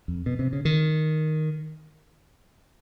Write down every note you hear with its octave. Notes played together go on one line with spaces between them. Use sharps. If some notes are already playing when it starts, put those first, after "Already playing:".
F2
B2
C3
C#3
D#3